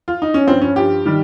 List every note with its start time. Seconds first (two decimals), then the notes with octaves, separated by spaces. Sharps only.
0.08 F4
0.22 D#4
0.34 C#4
0.47 G2 F3 C4
0.62 C#4
0.76 G2 F3 G4
1.05 D#3 G3